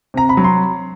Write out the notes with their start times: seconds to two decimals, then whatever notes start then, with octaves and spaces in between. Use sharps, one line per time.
0.14 C3 A#5
0.29 B5
0.37 F#3
0.44 C6